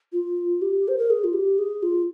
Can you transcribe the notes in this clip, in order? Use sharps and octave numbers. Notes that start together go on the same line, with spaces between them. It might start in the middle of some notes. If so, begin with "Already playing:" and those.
F4
G4
C5
A#4
G#4
F4
G4
G#4
F4